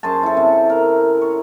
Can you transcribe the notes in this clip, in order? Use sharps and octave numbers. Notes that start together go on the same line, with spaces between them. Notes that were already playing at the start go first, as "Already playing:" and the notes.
F#2 G#4 C5 A5
E4 A4
C3
A#4
C#5